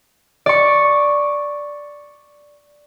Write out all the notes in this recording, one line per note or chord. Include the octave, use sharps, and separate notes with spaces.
D5 C#6